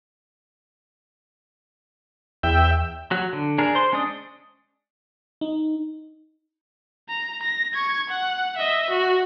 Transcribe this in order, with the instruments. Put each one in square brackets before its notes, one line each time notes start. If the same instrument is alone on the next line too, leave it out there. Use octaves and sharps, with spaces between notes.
[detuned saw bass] E2 [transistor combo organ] E5 G5
[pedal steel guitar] F#3 F#4
D3
D4 G#4 A#4
C5 C6
G#3 C#4 D4 D5 D#6
[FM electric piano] D#4
[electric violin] A#5
A#6
C#6 G#6
F#5
D#5 E5
F#4